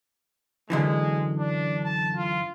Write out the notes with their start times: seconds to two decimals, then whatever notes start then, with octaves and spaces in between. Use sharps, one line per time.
0.70 F#2 D3 E3 G#3
1.37 D4
1.84 A5
2.15 F4